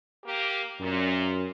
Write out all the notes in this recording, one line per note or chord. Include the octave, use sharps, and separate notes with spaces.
A#3 G4
F#2 A#2